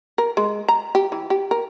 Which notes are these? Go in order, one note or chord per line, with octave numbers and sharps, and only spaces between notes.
A#4
G#3
A#5
G4
E3
G4
A#4